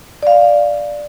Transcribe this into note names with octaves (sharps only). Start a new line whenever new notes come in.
D5 F5